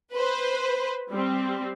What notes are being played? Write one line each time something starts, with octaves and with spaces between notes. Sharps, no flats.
B4 C5
G3 C4